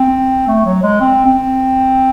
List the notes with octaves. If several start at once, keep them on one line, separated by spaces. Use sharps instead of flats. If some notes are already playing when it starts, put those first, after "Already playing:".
Already playing: C4
A3
F#3
G#3
C4
C4